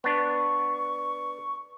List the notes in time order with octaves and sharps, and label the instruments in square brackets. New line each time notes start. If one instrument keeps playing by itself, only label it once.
[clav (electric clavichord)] B3 D4 [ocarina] C#6